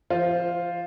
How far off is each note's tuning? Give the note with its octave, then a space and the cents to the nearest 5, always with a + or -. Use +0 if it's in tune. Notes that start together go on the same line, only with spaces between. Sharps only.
F3 -30 F4 +0 C5 +0